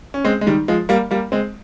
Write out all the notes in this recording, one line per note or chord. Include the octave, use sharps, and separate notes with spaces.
C#4
G#3 C4
G#3
D#3 G3
F3 G#3
G3 A#3
G3 A#3
G#3 C4